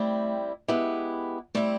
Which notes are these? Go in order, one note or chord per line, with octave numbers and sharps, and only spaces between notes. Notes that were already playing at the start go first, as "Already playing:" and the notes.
Already playing: G3 A3 C4 E4
G#3 B3 E4 G4 B4
G3 A3 C4 E4